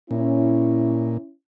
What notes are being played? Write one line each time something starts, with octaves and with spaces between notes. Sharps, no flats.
A#2 C#4 E4